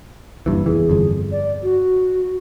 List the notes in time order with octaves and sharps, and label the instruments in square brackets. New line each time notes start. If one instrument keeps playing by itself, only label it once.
[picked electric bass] F#1 G2 E3 [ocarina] A#3
[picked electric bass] F#1 E2 E3 [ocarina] G#4
[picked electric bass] G1 F2
[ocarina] D5
F#4